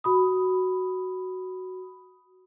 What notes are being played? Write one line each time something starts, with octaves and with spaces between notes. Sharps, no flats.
F#4 B5 D#6